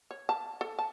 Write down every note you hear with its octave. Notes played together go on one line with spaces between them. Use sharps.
C#5
A5
A4
A5